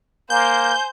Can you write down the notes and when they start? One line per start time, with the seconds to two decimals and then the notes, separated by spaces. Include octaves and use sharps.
0.30 A#3 C5 G#5 G6